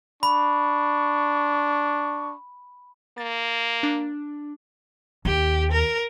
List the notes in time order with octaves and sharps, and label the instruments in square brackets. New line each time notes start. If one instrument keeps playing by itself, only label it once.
[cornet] D4 [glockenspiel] B5 [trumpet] C#6
[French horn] A#3 [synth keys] A6
[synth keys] D4
[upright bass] D#2 [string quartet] G4
[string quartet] A#4